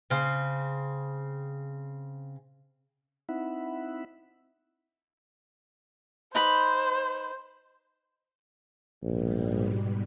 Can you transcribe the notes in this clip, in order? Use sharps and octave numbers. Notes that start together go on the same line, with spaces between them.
C#3 C4
C4 D#4 E4 E5 F#5 B5
D#4 B4 C5 B5
A#1 G#2 B2 G3